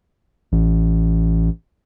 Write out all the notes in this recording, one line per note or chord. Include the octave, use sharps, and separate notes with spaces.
A1